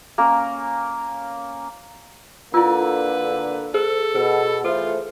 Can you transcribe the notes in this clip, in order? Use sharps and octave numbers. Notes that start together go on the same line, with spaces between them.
A#3 C#4 A#4
D3 A#3 E4 F4 B4 E6
G#4 A4 C5
B2 G#4
E3 A3 F4 A4 C5